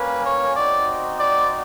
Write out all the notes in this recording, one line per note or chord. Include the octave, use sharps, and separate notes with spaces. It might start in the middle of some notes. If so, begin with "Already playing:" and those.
Already playing: G3 A#3 C#4 B4
C#5
C4 D#4 F#4 D5
D5